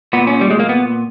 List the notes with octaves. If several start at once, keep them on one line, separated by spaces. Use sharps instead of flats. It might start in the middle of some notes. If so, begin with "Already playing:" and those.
A#2 B3
C#4
G3
G#3
A#3
B3